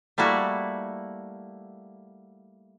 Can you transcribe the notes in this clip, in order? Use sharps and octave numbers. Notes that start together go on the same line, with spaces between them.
G3 A3 A#3 E4 F#4